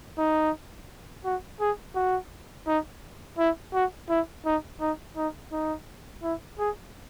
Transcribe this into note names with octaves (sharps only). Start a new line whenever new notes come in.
D#4
F#4
G#4
F#4
D#4
E4
F#4
E4
D#4
D#4
D#4
D#4
E4
G#4